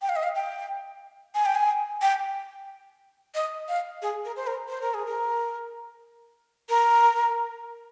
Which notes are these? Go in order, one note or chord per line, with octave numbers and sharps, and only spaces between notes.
G5
F5
D#5
F5
G5
G#5
G5
G#5
G5
D#5
F5
G#4
A#4
C5
A#4
C5
A#4
G#4
A#4
A#4